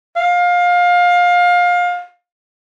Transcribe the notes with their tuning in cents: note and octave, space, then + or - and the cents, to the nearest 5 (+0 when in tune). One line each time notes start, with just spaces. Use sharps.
F5 +25